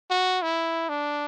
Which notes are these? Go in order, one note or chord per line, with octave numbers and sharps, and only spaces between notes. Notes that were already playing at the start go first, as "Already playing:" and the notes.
F#4
E4
D4